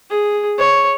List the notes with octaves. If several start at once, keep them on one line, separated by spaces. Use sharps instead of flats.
G#4
C#5